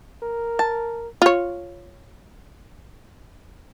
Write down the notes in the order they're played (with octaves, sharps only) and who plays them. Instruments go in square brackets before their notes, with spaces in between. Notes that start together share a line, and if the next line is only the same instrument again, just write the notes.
[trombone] A#4
[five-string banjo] A5
[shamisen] F4 C#5